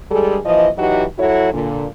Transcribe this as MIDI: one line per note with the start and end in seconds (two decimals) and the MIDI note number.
0.11 0.38 43
0.11 0.38 55
0.11 0.38 56
0.11 0.38 68
0.11 0.38 69
0.46 0.69 39
0.46 0.69 52
0.46 0.69 53
0.46 0.69 75
0.77 1.04 52
0.77 1.04 54
0.77 1.04 63
0.77 1.04 66
0.77 1.04 67
0.77 1.04 75
1.19 1.52 54
1.19 1.52 64
1.19 1.52 66
1.19 1.52 69
1.19 1.52 73
1.54 1.85 46
1.54 1.85 50